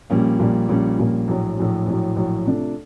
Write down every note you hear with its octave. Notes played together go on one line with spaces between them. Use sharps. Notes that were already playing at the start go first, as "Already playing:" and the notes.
A#1 A#2 G3 A#3 C#4
A#1 A#2 G3 A#3 C#4
A#1 A#2 G3 A#3 C#4
A#1 A#2 G3 A#3 C#4
A#1 A2 F#3
A#1 A2 F#3
A#1 A2 F#3
A#1 A2 F#3
C3 F3 A3 D4